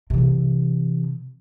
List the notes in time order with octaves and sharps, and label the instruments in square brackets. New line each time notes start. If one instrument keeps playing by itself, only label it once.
[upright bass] C3 E3